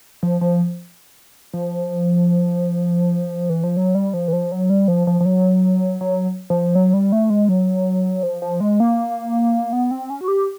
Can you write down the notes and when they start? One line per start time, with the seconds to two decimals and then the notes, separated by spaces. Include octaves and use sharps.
0.23 F3
0.41 F3
1.54 F3
3.50 E3
3.64 F3
3.77 F#3
3.95 G3
4.14 F3
4.28 E3
4.33 F3
4.52 F#3
4.70 G3
4.88 F3
5.07 F3
5.21 F3
5.25 F#3
6.01 F#3
6.50 F3
6.75 F#3
6.94 G3
7.12 A3
7.30 G#3
7.49 F#3
8.23 F3
8.42 F3
8.60 G#3
8.80 A#3
9.73 B3
9.91 C4
10.10 C#4
10.21 F#4
10.28 G4